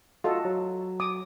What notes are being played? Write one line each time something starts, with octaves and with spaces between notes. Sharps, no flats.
F4 F#4 A4 D#5
F#3
D6 D#6